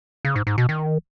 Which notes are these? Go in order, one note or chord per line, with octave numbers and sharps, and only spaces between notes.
C#3
G#2
G#2
B2
D#3